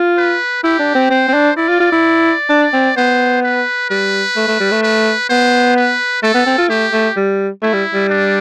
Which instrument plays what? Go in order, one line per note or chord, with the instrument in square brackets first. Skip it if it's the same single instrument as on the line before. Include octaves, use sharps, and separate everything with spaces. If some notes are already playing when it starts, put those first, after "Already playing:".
Already playing: [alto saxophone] F4
[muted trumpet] B4
[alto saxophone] E4 [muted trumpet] G4
[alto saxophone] D4
C4
[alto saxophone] C4 [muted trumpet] C5
[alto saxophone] C4
D4
[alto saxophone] E4 [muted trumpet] D5
[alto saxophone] F4
F4
E4
D4
C4
[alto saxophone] B3 [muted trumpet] C5
[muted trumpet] B4
[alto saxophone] G3 [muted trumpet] B4
[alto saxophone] A3
A3
G3
A3
[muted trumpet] B4
[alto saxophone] B3 [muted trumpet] C5
[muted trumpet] B4
[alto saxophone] A3 [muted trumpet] A4
[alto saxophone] B3
C4
F4
[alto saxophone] A3 [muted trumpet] G4
[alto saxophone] A3
G3
[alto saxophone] A3 [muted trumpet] E4
[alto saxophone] G3
G3
[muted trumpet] D4